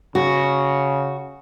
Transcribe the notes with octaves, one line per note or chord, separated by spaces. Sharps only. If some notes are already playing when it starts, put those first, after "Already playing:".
C#3 F#4